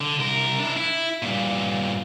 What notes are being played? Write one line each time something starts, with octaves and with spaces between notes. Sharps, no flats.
D3
C2 A#4
D4 E4
E4
G2 A#2